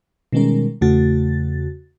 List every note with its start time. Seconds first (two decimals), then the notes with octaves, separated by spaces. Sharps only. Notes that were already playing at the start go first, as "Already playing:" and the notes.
0.33 B2 D#3 G3 G#3 C#4 A#4
0.81 E2 C#3 A3 F#4 A6